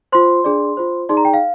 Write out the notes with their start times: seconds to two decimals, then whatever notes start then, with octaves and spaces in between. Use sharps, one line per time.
0.12 F4 C5 C6
0.44 D4 G#4 D5
0.77 F4 C5
1.09 D#4 G#4 D5 C6
1.17 A#5
1.25 G5
1.34 F5